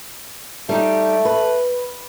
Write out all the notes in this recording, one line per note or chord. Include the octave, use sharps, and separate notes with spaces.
G3 A3 D#4 G4
B4